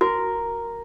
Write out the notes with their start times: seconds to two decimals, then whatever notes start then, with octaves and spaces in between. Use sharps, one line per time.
0.01 F#4 A#4